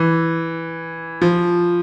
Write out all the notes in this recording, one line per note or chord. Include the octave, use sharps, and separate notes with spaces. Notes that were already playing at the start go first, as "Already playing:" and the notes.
Already playing: E3
F3